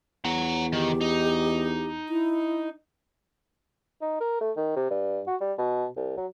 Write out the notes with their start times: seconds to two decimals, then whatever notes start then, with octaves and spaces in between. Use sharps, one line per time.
0.25 E2 F#5 A#5
0.73 D#3 G4
1.01 D#4
2.09 E4
4.02 D#4
4.21 A#4
4.41 A3
4.57 D#3
4.76 C3
4.90 G2
5.27 F#4
5.41 G3
5.58 B2
5.97 C2
6.17 F#3